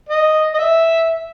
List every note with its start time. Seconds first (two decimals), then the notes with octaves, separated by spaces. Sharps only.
0.09 D#5
0.54 D#5
0.58 E5